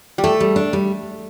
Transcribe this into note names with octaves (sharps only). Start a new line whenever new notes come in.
G3
A3 A4
G3
D4
G3